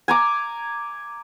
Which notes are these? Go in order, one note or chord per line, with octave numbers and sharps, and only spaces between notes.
G#5 A#5 D6